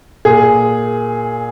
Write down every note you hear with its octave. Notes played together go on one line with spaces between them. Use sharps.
A#2 G#4